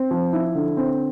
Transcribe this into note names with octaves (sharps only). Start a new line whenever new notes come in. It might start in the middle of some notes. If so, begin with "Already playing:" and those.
Already playing: C4
F3
E4
D3
C4